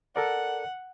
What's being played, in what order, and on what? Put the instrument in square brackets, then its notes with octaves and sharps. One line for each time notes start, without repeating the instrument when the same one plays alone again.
[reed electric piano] A4 A#4 D5 [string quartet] F#5